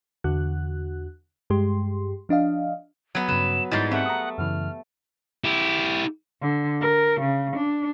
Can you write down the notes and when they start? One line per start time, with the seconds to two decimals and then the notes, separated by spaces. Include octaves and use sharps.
0.24 E2 D3 F#4 F#6
1.50 G2 G#3 G4 C6
2.29 F3 D4 D#5 F5
3.15 F#3 B3
3.28 G2 C#3 B4 E7
3.71 G#2 G3 G#3 E4 A6 C7
3.91 A3 C4 F#5
4.06 A#5 D#6
4.38 F#2 C#3 E3 F6
5.44 E4 G4
6.42 D3
6.81 A#4
7.21 C#3
7.57 D4